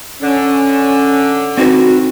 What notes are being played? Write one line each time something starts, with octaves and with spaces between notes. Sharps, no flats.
D3 C#4
C4 D#4 F#4 B4